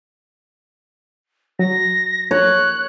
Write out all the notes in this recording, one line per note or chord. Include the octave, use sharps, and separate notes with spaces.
F#3 A#6
C#5 F#6